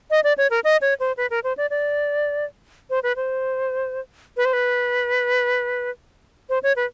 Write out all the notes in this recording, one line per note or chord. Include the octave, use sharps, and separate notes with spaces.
D#5
D5
C#5
A#4
D#5
C#5
C5
B4
A#4
C5
D5
D5
C5
B4
C5
B4
C5
B4
C5
C#5
B4